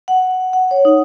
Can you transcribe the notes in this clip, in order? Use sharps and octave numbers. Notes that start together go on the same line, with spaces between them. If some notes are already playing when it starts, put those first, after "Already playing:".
F#5
F#5
C#5
D#4